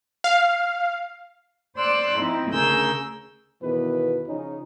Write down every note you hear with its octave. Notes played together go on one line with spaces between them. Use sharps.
F5
C5 D5 C6 D6 E6 F#6
F3 C4 D#4 E4
D2 C#3 G#4 A#4 E6 G6
E2 B2 D#3 F3 B4
C#3 F3 C#4 D#4